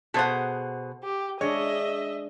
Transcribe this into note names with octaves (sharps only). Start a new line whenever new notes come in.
B2 G#4 A4 C5 F#5
G4
G#3 D4 C#5 D#5 E5